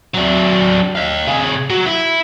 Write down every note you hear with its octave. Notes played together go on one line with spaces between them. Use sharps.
F#3 D4
D#5 F5
C3 G#4
F#3
E4